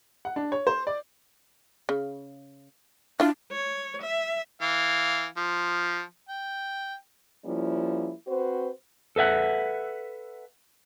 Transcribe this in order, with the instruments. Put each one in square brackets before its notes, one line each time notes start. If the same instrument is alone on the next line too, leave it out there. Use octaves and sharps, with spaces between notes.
[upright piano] F#5
D4
C#5
C5
D5
[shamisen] C#3
[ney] D4 [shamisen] E4 F4
[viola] C#5
E5
[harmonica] E3 F5
F3
G5
[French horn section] F3 G3 A#3 C#4 E4
C4 F#4 B4 C5
[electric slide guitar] A4 B4 E5 F#5